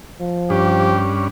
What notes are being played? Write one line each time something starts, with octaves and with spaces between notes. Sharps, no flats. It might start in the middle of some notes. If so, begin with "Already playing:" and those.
F3
G2 C#4 D4 G4